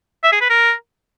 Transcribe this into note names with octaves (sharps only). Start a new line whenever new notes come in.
E5
G#4
B4
A#4